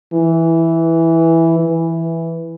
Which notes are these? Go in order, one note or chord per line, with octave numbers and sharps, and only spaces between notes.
E3
E3